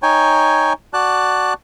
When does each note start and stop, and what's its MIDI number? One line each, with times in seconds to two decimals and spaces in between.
0.03 0.73 63
0.03 0.73 73
0.03 0.73 79
0.03 0.73 80
0.94 1.53 66
0.94 1.53 74
0.94 1.53 81
0.94 1.53 90